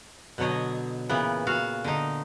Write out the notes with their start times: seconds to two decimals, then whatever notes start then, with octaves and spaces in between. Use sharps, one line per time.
0.38 B2 D3 F#3 C#5 D#5
1.09 A#2 C#3 E3 B3
1.47 F#4 F5
1.84 D3 D#4